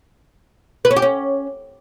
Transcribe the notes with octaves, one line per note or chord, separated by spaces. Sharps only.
B4
C#4
G4
C#4